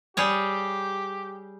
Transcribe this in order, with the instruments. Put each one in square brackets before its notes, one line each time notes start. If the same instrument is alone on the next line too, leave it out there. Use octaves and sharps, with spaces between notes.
[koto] G3 G#4 C#5 [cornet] G4